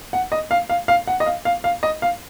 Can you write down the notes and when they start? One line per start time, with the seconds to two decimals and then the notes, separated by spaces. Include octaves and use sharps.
0.13 F#5
0.32 D#5
0.51 F5
0.70 F5
0.88 F5
1.07 F#5
1.20 D#5
1.26 F5
1.45 F5
1.64 F5
1.83 D#5
2.02 F5